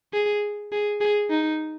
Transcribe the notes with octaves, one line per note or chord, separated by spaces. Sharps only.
G#4
G#4
G#4
D#4